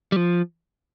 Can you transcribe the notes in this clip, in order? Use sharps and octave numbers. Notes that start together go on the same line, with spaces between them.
G3
F3